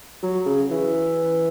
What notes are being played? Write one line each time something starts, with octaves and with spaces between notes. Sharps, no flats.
F#3
C#3
E3